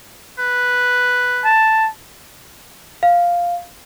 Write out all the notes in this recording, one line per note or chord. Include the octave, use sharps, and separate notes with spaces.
B4
A5
F5